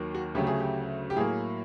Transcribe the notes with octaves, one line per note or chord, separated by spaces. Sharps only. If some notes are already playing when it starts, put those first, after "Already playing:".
Already playing: D#2 D#3 F#3 A#3
F#4
D2 C#3 F#3 A3 G4
G#4
G4
G4
A2 F#3 A#3 G#4